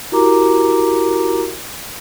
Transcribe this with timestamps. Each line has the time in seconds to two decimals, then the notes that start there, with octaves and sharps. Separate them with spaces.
0.12 E4 F#4 G4 A#4 A#5 D6